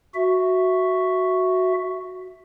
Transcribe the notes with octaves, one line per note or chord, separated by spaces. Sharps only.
F#4 E5